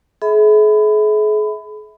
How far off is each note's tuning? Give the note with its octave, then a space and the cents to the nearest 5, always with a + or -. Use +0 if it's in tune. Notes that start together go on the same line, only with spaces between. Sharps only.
G#4 +40 E5 -30 B5 +25